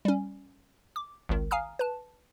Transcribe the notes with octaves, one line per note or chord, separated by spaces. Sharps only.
G3 C#4
D6
G#1 C#2 D#3
F5 G#5 A#5 D#6 F6
B4 A5